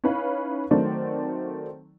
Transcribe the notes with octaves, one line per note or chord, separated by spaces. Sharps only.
C#4 D#4 E4 B4 C#5 F5
D#3 F#3 A3 C4 D5